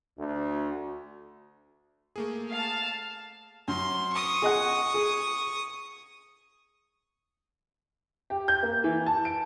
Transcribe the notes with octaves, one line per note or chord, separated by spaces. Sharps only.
D2
A3 A#3 G#4
F5 A5
F#2 C6
C#6 D#6
G#4 D#5 F#5
G#4
G4
G6
A#3
E3
A5
D7